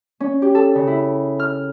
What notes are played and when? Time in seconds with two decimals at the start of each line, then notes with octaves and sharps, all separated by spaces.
0.20 C#4
0.42 G4
0.55 A4
0.75 C#3
0.87 E4
1.40 F6